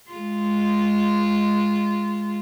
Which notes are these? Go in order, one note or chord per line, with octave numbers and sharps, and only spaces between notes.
G#3 F4